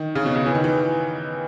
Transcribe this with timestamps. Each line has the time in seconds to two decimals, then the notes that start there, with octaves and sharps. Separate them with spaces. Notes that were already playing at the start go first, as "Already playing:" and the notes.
Already playing: D#3
0.15 C#3
0.26 B2
0.36 C#3
0.46 E3
0.55 D#3
0.64 E3